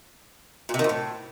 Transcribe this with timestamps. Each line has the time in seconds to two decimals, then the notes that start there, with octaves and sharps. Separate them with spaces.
0.69 A#2
0.74 C3
0.79 D#3
0.84 F2
0.89 A2